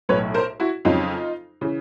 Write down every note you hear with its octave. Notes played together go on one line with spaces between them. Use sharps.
B1 A2 F#3 B4 C#5
A#4 C5
E4 F#4
F2 C#3 F#3 D#4 F4
C#3 E3